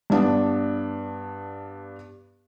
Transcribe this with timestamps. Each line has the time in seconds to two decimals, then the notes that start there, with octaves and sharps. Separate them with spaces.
0.10 G2 B3 D4